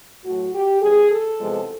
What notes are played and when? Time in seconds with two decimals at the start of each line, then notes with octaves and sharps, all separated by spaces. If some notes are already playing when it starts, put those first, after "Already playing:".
0.25 A2 F#3 A3 F#4
0.54 G4
0.81 E2 C#3 E3 G3 G#4
1.11 A4
1.39 E2 C3 F3 G#3